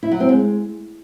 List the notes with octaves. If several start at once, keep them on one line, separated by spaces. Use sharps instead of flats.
E4
F#3
C4
G#3